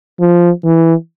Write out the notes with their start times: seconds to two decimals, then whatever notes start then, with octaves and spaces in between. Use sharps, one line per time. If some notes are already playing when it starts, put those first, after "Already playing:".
0.20 F3
0.64 E3